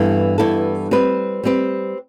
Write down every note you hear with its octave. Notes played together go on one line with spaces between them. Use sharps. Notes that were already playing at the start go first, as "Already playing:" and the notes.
Already playing: G2 E3 B3 E4 A4
G2 E3 B3 E4 A4
G3 C4 G4 B4
G3 C4 G4 B4